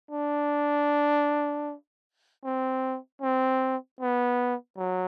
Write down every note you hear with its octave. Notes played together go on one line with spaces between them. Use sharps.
D4
C4
C4
B3
F#3